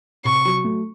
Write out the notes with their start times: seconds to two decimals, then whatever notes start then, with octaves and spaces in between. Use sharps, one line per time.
0.25 C3 C#6
0.45 F#3
0.64 A3